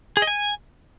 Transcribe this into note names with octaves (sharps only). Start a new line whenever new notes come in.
G#4
D#5
G#5